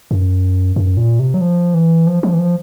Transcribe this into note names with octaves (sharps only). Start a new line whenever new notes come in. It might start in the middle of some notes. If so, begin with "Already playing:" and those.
F#2
F#2
A#2
C3
F#3
F3
E3
F3
F3
E3
F3